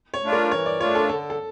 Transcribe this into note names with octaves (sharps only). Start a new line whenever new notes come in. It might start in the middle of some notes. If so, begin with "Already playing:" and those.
C#5
A3 D4 F4
A#4
E3 C#5
D5
A3 D4 F4 C#5
A4
D3 A4
A4